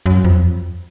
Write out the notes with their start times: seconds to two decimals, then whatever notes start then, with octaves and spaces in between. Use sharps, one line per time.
0.06 F#2
0.24 F2